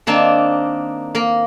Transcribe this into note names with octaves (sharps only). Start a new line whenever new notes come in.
D#3 A#3 C4 D4 D#4
A#3 A#4